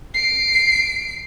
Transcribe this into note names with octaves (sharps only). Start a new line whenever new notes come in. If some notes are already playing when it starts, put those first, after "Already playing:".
C7 D7